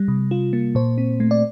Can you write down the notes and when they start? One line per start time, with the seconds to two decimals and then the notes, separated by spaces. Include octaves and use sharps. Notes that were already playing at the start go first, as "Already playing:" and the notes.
Already playing: G3
0.08 C3
0.31 F4
0.53 A#3
0.75 A#2 C5
0.98 C4
1.20 A3
1.31 D5